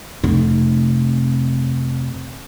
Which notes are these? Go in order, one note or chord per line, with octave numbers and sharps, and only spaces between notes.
F1 C3